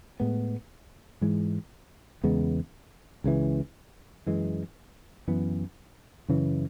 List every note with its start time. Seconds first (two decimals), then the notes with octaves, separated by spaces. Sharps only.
0.20 A2 G#3 B3
1.21 G#2 E3 G#3
2.24 E2 C#3 G#3 B3
3.24 C#2 C#3 E3
4.26 F#2 E3 G#3
5.28 F#2 E3 B3
6.28 F#2 C#3 E3